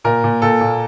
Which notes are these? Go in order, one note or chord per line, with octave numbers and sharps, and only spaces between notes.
A#2 A#4
A#2
A#2 A4
A#2